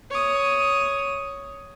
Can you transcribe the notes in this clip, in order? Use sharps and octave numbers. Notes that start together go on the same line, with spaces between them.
C#5 D#6